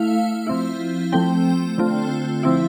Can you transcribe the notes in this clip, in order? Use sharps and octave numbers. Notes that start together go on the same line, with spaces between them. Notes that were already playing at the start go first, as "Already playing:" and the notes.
Already playing: A3 E4 F5
F3 C4 E4
F3 A3 C4 G5
D3 A3 C4 F4
F3 C4 E4